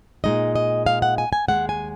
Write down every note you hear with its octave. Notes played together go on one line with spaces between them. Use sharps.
A#2 G#3 D#4 D#5
D#5
F5
F#5
G#5
G#5
D#2 C#3 G#3 F#5
G#5